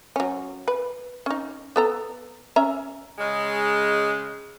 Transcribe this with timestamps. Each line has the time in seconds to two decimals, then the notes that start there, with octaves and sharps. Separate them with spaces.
0.16 F#3 C#4
0.68 B4
1.26 C#4 D#4
1.76 B3 A4 A#5
2.56 C#4 E5 A#5
3.19 C#3 G#3